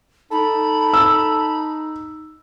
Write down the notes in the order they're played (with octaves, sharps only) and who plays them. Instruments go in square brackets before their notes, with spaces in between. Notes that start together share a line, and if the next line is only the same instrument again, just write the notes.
[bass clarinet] D#4 [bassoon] A4 [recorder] B5
[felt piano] E6